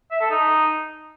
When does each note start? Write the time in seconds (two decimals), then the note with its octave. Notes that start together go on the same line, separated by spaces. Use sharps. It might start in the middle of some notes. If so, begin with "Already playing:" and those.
0.11 E5
0.21 A4
0.30 D#4